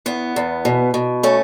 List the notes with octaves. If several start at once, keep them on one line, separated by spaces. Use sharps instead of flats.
E2 B3
E2
B2
B2
A3 C#4